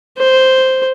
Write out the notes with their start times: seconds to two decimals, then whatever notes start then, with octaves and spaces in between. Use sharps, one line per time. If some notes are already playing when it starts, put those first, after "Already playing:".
0.18 C5